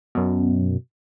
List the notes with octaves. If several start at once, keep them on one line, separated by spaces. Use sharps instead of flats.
F#2 B2